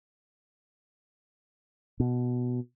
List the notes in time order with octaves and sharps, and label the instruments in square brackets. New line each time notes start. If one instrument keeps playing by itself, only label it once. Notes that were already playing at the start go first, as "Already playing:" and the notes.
[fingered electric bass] B2